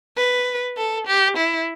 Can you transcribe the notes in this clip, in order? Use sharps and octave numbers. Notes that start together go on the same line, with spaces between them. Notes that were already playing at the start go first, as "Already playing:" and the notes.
B4
A4
G4
E4